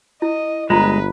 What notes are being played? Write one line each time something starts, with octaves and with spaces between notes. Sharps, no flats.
E4 D#5
G1 G#3 F4 B4 A#5